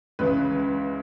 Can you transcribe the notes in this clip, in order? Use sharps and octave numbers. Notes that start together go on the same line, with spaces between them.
C#2 C#3 E3 B4